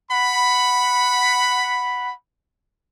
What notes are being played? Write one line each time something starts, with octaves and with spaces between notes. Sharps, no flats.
F#5 B5